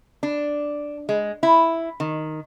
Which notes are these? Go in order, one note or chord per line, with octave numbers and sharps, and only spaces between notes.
D4
G#3
E4
D#3